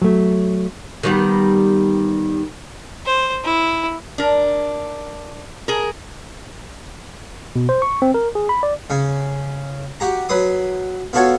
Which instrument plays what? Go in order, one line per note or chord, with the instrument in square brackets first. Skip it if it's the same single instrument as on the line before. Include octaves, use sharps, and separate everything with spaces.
[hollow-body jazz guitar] F#3 A3
[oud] D#3 G3 B3
[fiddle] C5
E4
[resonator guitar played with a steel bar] D4 A#4
G#4 A#4
[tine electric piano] B2
C5
C#6
C4
A#4
G#4
B5
D5
[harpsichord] C#3 C#4
F#4 G4 A#5
F#3 B4 C6 D#6
B3 F4 F#4 A4 C#5